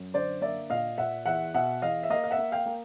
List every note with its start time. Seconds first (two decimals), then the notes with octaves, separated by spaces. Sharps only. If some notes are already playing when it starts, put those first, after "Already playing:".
Already playing: F#2
0.14 D3 C5 D5
0.41 A#3 D5 E5
0.70 A#2 D#5 F5
0.98 A#2 E5 F#5
1.26 E2 E5 F#5
1.54 B2 E5 F#5
1.82 E2 D#5 F5
2.03 E5
2.10 A#3 D#5 F5
2.24 F5
2.31 E5 F#5
2.38 A#3
2.52 F5 G5
2.66 A#3